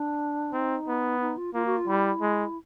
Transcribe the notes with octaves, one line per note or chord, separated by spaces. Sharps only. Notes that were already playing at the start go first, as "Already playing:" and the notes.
Already playing: D4
C4 D#4
B3
D#4
F4
A#3 F4
F#4
F4
G3 E4
G#3